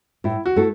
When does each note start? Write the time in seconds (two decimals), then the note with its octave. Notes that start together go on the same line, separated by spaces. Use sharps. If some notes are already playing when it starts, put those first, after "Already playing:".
0.24 A2 E4
0.46 F#4
0.56 A3 E4 A4